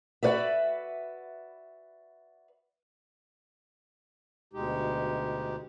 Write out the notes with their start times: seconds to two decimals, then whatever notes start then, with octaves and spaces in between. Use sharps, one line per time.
0.23 F#4 B4 D5 E5
4.53 D2 B2 G#3 D#4 G4